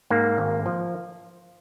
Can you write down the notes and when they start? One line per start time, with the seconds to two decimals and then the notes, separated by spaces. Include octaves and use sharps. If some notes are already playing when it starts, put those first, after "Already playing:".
0.10 G#2 A#3
0.38 G#1
0.66 F3